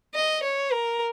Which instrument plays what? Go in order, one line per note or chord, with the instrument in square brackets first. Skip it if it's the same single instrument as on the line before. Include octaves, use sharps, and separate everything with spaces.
[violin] D#5
C#5
A#4